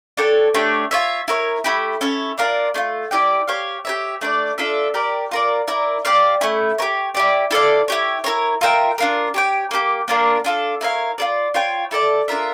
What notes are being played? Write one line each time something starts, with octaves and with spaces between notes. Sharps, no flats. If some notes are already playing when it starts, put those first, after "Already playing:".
D4 A4 C#5 G5
A3 D4 G4 C#5
F4 C#5 E5
E4 A#4 C#5
A3 E4 G4
C#4 E4 A4 C#5
D4 F4 A#4 D5
A3 D4 F4
E4 G4 D5 G5
G4 C#5 F5
G4 C#5 E5
A3 D4 A4 D5
D4 F4 A4 E5
G4 A#4 D5
F4 A#4 D5
E4 A#4 D5
G4 D5 F5
A3 C#4 E4
G4 A#4 C#5
E4 G4 D5
E4 A4 D5 F5
E4 G4 C#5
E4 A#4 C#5
F4 A#4 E5 G5
D4 F4 A#4
G4 C#5 G5
A#3 D4 G4
A#3 D4 F4 A#4
D4 F4 A4
E4 A#4 C#5 F5
F4 A4 D5
F4 C#5 G5
E4 A4 D5 A5
D4 F4 A#4 E5